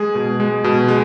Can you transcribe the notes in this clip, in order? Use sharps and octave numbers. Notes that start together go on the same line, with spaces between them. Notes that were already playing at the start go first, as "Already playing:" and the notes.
Already playing: G#3 G#4
B2
G#3
B2
G#3